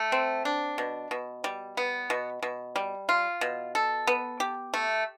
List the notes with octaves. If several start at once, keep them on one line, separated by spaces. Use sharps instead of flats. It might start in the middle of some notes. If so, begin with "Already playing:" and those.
Already playing: A3
C4
D4
B2
B2
G3
B3
B2
B2
G3
F4
B2
A4
B3
G4
A3